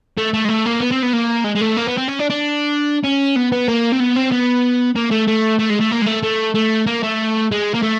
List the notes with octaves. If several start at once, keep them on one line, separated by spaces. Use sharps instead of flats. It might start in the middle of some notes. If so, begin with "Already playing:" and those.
A3
A3
G#3
A3
A#3
B3
C4
B3
A#3
G#3
G#3
A3
A#3
B3
C4
C#4
D4
D4
C#4
B3
B3
A#3
C4
B3
C4
B3
A#3
A3
A3
A3
G#3
A3
A#3
G#3
A3
A3
A3
A#3
A3
G#3
A#3
A3